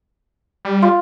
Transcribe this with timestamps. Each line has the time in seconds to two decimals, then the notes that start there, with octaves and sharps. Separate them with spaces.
0.65 G3
0.82 F4